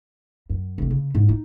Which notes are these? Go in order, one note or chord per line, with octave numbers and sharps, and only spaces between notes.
F#2
F1 C4
C#3
G#2
D#4